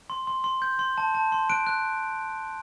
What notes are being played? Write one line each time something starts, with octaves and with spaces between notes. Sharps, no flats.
C6
C6
C6
G6
C6
A5
A5
C6
F#6 D7
F#6